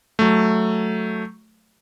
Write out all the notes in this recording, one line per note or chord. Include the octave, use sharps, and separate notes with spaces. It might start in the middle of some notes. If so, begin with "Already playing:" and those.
F#3 A3